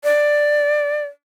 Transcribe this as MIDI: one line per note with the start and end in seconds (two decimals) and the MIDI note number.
0.04 1.04 74